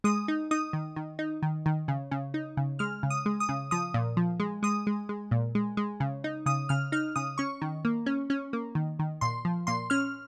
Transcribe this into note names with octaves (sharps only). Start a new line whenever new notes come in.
G#3 D#6
D#4
D#4 D#6
D#3
D#3
D#4
D#3
D#3
C#3
C#3
D#4
C#3
G#3 F6
C#3
D#6
G#3
D#6
C#3
F3 D#6
A#2
F3
G#3
G#3 D#6
G#3
G#3
A#2
G#3
G#3
C#3
D#4
C#3 D#6
C#3 F6
D#4 F6
C#3 D#6
C#4 C#6
D#3
A#3
C#4
C#4
A#3
D#3
D#3
A#2 C6
F3
A#2 C6
C#4 F6